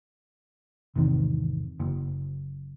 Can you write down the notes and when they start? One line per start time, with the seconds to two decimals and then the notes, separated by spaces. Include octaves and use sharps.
0.96 G#1 E2 C3 D#3
1.80 F#1